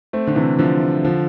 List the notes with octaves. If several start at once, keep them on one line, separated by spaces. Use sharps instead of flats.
A3 C4
D3
C3 E3
D3 F3
D3 F3